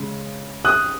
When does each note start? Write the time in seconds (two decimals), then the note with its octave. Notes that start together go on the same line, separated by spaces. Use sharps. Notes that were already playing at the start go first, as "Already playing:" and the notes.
Already playing: C#3 G#3
0.65 D#6 F#6